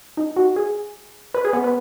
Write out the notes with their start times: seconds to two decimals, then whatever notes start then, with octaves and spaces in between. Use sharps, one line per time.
0.17 D#4
0.36 F#4
0.56 G#4
1.34 B4
1.45 G#4
1.53 B3
1.64 B3